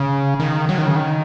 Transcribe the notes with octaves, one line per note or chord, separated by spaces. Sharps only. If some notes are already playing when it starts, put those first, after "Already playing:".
Already playing: C#3
D#3
F#3
D#3
C#3
D#3